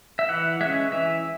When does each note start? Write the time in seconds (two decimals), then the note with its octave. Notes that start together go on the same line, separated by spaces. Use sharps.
0.19 E5
0.29 E3 F#5
0.61 G#3 C#4 E5
0.92 E3 E5